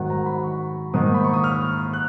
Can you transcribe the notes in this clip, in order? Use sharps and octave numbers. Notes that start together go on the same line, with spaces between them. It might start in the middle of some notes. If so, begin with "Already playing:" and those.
Already playing: G#2 D#3 F#3 F#5
A#5
B5
C#6
G#2 D#3 A#3 D#6
B5
C#6
D#6
F6
F#6